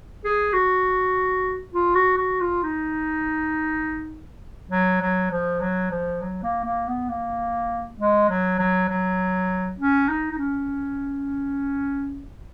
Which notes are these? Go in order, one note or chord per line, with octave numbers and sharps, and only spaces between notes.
G#4
F#4
F4
F#4
F#4
F4
D#4
F#3
F#3
F3
F#3
F3
F#3
A#3
A#3
B3
A#3
G#3
F#3
F#3
F#3
C#4
D#4
D#4
C#4